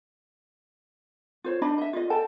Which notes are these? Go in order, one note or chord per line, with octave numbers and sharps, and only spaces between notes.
F4 C5 C#5
D4 D#4 D#5 B5
D#5 E5
F4 D#5
A4 G5 A5